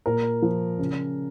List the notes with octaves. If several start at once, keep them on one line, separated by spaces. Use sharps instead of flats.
A#2 A#4
F3
C#3